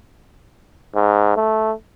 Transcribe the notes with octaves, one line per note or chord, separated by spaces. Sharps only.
G#2
A3